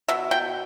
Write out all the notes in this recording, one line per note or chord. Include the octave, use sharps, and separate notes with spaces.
B2 E5
B2 G5